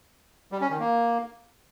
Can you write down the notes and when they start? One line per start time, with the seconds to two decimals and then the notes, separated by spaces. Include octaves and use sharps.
0.52 G3
0.61 C#4
0.70 D#3
0.79 A#3